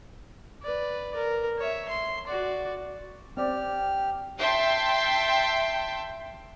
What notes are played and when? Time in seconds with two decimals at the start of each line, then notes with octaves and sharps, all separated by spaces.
0.62 B4 D5
1.15 A#4
1.58 C#5 E5
1.89 C6
2.27 F#4 D5
3.37 C4 G4 D5 F6
4.40 E5 G5 A5 C6